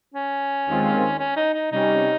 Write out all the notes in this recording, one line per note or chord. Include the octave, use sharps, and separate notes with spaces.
C#4
D#2 D#3 G#3 C4 F4
C#4
D#4
D#4
C3 G3 C#4 D#4